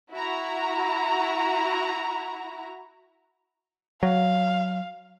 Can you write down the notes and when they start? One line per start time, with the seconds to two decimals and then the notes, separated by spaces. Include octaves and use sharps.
0.11 E4 F#4 A#5
4.03 F#3 F5